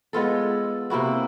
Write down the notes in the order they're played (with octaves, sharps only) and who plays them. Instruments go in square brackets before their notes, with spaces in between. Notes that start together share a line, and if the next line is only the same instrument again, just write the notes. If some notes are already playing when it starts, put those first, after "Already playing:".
[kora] G#3 B3 F4 A4
C3 A#3 E4 F#4